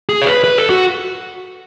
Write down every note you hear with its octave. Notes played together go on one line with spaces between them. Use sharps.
G#4
C#5
B4
B4
A4
F#4